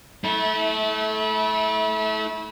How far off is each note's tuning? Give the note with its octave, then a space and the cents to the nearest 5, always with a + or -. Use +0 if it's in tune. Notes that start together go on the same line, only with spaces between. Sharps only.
A3 -20 E4 -30